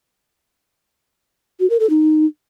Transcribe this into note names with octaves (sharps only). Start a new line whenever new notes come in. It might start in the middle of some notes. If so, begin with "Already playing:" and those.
F#4
A#4
A4
D#4